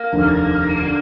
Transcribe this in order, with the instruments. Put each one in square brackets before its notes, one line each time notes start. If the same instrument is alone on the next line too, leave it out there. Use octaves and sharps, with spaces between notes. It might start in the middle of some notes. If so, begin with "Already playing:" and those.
Already playing: [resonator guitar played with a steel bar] A#3
[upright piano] F1 D#2 D3
D3